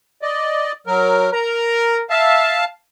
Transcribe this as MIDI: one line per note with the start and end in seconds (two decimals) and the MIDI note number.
0.22 0.72 74
0.22 0.72 75
0.87 1.30 54
0.87 1.30 70
1.32 2.04 70
1.32 1.97 82
2.10 2.62 76
2.10 2.65 77
2.10 2.65 81